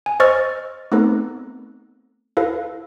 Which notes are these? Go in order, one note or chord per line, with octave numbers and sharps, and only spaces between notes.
G#5
C5 D#5 C#6 E6 F6 A6
A3 B3 C4 D#4 A4 B4
E4 A4 B4 F5